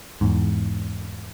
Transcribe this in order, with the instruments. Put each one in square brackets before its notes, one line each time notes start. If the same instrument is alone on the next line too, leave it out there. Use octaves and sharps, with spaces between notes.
[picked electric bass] E2 G#2